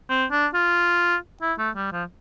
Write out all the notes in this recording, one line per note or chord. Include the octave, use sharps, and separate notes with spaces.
C4
D4
F4
E4
A3
G3
F3